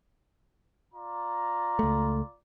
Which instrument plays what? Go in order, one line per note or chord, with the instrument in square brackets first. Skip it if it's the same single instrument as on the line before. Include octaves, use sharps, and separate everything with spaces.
[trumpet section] F4 D5 A#5
[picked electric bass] C#2 A3